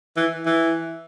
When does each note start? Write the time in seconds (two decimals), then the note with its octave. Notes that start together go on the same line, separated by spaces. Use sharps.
0.17 E3
0.46 E3